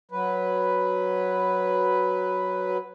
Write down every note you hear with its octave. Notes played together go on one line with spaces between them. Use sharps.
F#3 B4